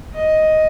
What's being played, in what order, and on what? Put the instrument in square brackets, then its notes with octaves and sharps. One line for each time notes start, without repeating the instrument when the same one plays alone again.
[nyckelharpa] D#5